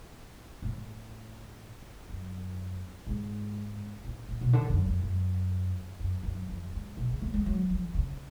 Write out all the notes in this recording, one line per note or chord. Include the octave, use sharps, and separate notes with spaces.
A2
F#2
G#2
A2
A2
B2
D3
F#2
F2
F#2
F#2
F#2
F2
G#2
B2
C#3
A3
G#3
F#3
F3
C#3